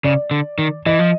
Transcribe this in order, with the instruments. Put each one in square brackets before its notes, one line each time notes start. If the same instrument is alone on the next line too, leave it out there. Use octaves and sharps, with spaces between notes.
[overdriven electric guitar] C#3 [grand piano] D5
[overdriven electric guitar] D3
D#3
[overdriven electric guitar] E3 [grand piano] D#5
[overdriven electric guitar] F3